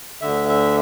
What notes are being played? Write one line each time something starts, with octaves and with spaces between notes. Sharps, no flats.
D2 D3 E5
E5